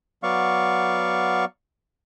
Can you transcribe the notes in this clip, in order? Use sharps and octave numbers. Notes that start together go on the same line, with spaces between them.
F#3 B3 D5 F5 C#6